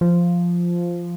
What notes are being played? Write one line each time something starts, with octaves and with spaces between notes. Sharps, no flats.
F3